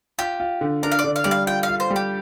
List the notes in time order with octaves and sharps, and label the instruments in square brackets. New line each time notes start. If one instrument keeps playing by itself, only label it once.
[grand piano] F4 [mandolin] G4
[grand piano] F4
D3
[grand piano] D4 [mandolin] A#4
[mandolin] F5
D5
[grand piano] D3
[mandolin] F5
[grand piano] G3 [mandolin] D5
[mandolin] F5
[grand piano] F4 [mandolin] G5
[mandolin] F5
[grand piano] F4
[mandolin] C5
[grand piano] G3
[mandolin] G4